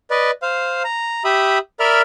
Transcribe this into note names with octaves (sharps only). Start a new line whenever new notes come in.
B4 D5 D#5
C5 F5
A#5
G4 E5 B5 D#6
A#4 D5 E5 B5 F6